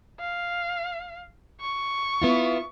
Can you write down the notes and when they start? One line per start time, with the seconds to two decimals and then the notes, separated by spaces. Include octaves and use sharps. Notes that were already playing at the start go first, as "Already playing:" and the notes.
0.20 F5
1.60 C#6
2.22 B3 E4 F4